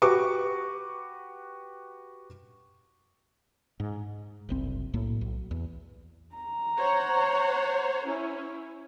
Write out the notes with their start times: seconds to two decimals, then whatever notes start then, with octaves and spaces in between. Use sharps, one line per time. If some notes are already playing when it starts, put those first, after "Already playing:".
0.02 F#4 G4 B4 C#6 D6
3.80 G#2
4.49 F#1 C2 C4
4.94 B1 A2 A#3
5.21 B1
5.51 E2
6.35 A#5
6.78 C5 C#5 F#5
8.06 C#4 E4